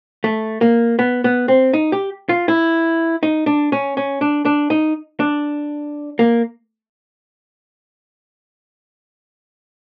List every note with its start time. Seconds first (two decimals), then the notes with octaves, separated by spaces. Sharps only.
0.24 A3
0.61 A#3
0.99 B3
1.24 B3
1.48 C4
1.73 D#4
1.92 G4
2.29 F4
2.48 E4
3.23 D#4
3.46 D4
3.72 C#4
3.97 C#4
4.21 D4
4.45 D4
4.70 D#4
5.20 D4
6.19 A#3